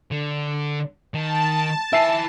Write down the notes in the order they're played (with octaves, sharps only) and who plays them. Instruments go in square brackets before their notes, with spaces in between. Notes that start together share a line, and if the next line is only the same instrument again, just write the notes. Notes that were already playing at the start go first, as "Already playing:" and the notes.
[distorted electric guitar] D3
[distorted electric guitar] D#3 [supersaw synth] A5
[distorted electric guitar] E4 G#5 [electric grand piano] E5 C7